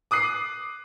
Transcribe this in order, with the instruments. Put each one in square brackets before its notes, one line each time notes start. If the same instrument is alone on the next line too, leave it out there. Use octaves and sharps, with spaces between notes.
[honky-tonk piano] D6 D#6 F#6 C7